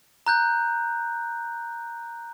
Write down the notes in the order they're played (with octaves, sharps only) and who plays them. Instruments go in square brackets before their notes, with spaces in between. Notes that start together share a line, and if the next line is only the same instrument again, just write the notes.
[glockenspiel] A#5 F#6 G6